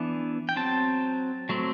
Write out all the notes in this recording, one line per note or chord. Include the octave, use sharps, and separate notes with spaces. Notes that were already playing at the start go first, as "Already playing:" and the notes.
Already playing: E3 B3 D4
G5
F#3 C4 A5
F#3 A3 C4